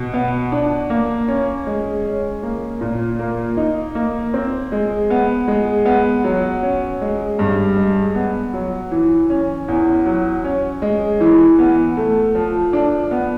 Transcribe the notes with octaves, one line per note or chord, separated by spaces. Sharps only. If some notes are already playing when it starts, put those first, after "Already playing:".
Already playing: B2
B3
D4
A#3
C#4
G#3
C#4
A#3
A#2
A#3
D#4
A#3
C4
G#3
B3
G#3
B3
F#3
C#4
G#3
G2
G#3
B3
F#3
E3
C#4
E2
F#3
C#4
G#3
E3
B3
A3
F3
D4
B3